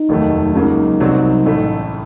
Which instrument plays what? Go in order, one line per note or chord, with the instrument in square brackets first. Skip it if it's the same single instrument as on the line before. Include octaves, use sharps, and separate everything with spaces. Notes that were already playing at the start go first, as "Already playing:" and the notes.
Already playing: [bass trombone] D#4
[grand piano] F1 D#2 D#3 F#3 A3
[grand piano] C#2 C#3 F#3 A#3 [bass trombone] D#4
[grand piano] C2 C3 F#3 C4
A1 A2 A3